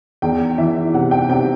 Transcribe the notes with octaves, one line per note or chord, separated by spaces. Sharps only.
E2 G5
E3 E5
C3 F#5
G5
C3 G5